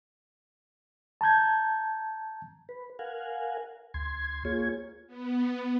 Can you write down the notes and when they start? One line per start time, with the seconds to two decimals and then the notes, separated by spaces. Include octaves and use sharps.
1.21 A5 A#5 G6 G#6
2.69 B4
2.99 A#4 F5 F#5 G#5
3.94 D2 C6 G#6
4.45 A#3 F4 G#4 C#5 G#6
5.07 B3